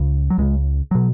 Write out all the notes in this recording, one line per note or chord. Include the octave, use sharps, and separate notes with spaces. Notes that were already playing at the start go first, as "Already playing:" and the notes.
Already playing: C#2 C#3
F#3
C#2 C#3 G#3
B2 F#3